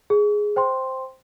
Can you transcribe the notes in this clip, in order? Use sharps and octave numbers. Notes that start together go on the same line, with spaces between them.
G#4
C5 G5 C6